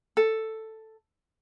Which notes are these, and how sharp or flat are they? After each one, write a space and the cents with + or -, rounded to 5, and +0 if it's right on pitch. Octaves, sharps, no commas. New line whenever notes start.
A4 +5